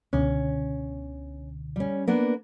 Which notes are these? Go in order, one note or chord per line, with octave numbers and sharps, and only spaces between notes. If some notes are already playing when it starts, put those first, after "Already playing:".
C#2 B2 D3 C#4
G3 C#4
A#3 B3 D4